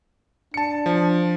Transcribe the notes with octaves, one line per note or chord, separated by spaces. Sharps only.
D4 A5 C#7
F3